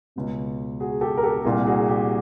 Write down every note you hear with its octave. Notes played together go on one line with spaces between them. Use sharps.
C#2 B2
F#4 G#4
G4 A4
A#4
G4 A4
C2 A#2
F#4 G#4
G4